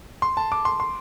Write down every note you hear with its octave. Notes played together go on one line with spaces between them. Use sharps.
C6
A5
D6
C6
C6